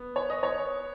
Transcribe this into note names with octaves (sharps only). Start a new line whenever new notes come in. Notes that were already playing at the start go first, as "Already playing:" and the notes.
Already playing: B3
C#5
D#5
C#5